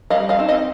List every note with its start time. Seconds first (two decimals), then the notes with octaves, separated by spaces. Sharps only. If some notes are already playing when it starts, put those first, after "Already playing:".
0.10 G3 D#5 F5
0.29 D#5 F5
0.39 C4 D#4
0.49 D#5 F5